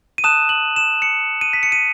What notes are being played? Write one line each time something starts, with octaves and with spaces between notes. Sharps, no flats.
D#7
A5 D#6 F#6 E7
F#7
E7
C#7
D#7
B6
C#7
D#7